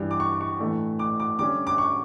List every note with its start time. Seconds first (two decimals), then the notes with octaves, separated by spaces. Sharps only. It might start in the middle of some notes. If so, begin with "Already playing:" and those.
Already playing: G2 E3 G3
0.11 D6
0.20 C#6
0.41 C#6
0.59 A2 E3 A3 D4
0.99 D6
1.20 D6
1.39 D3 G3 C#4 D6
1.67 D6
1.78 C#6